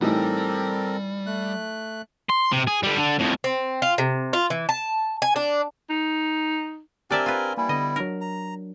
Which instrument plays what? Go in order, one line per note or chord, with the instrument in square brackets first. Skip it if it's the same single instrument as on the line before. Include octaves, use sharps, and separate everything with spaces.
[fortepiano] A2 E3 D#4 [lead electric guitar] G3 [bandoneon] C4 A4 A#4
[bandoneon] A3 F#6
[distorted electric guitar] C6
C3
G#4
D3 G3
D3
F2 A2
[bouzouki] C4
F4
C3
F4
E3
A5
G#5
D4
[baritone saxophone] D#4
[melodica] C4 A#4 G#5 [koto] D4 D5 E5 [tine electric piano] G4
[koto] F4 B4
[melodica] G3 E4 [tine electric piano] A#3 G#5
[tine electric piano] D3 B3 [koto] D#5
[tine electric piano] F#3 D4 [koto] A#4
[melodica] A#5